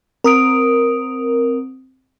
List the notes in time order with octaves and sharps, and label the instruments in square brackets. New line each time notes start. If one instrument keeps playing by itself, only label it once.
[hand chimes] C4 D#6 D7 [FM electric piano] A#4